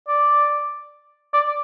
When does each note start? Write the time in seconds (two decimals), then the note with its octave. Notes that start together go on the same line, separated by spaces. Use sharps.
0.08 D5
1.34 D5